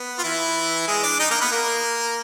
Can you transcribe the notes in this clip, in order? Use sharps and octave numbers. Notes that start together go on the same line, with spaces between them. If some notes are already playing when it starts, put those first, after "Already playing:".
Already playing: B3
F4
E3 E4
G#3 G#4
D4 D5
D#4 D#5
A#3 A#4
B3 B4
A#3 A#4